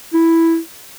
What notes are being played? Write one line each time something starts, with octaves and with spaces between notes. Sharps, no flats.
E4